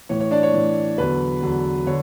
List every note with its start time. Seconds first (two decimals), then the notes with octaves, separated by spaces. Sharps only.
0.09 A2 E3 C#5
0.20 C#5
0.31 D4 D5
0.43 C#5
0.54 A2 E3
0.98 E2 D3 F#3 B4
1.43 E2 D3 F#3
1.87 D3 C#5